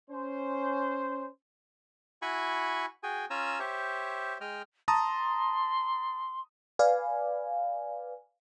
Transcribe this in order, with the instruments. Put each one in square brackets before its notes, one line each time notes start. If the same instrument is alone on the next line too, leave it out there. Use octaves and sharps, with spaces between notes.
[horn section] C#4 C5
[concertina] E4 F#4 G#5 B5 C#6
F#4 G#4 G5 G#5
C#4 F4 G#5 A#5 E6
G4 C5 C#5 E5
G#3 D#5 G5 F6
[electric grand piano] A5 A#5 D#6 [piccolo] C6
[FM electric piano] B4 D5 F5 G#5